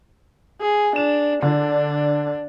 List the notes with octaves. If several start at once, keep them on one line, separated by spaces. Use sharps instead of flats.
G#4
D4 E7
D3 D4